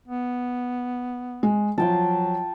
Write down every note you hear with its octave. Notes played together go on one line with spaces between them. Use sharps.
B3
G#3
F3 F#3 F4 G5 A5